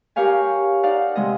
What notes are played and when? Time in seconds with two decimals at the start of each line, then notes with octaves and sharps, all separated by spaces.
0.16 G4 A#4 C#5 F5 G#5
0.83 D#4 D5 F5 F#5
1.16 C3 G#3 D#5